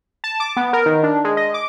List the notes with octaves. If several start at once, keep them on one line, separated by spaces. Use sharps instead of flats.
A5
D6
B3
A#4
D#3
D4
G#3
D#5
D6